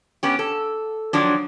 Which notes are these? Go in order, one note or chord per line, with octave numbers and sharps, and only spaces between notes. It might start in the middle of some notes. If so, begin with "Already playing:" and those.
B3 C#4 G4
A4
D#3 F3 F#3 D4